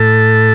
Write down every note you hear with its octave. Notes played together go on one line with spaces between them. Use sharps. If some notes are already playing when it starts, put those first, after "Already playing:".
Already playing: A2 A4